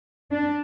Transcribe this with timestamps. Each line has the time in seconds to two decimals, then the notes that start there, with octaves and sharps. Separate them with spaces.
0.31 D4